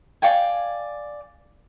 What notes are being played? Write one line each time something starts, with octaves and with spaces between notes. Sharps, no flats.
D5 F5 G5 G#5